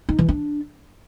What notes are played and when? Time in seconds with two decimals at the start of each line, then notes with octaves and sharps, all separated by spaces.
0.09 D#4
0.19 E3
0.29 D4